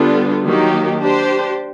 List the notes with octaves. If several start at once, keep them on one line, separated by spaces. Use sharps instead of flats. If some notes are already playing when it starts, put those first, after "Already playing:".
Already playing: D3 G3 B3 D4 F4
D#3 F#3 A#3 D#4 G4
D4 G4 C5